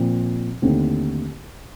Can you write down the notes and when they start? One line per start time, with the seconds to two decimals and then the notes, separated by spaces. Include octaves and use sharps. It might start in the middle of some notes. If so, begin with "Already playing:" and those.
Already playing: A#2 F3 C4
0.62 D#2 D3 A3 C4